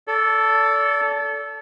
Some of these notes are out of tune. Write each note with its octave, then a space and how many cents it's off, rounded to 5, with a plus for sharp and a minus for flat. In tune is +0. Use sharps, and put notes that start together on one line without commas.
A4 +0 D5 -35